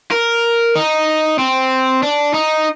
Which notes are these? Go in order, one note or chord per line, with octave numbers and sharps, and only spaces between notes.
A#4
D#4
C4
D4
D#4